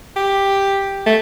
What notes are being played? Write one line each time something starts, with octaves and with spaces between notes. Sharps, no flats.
G4
A3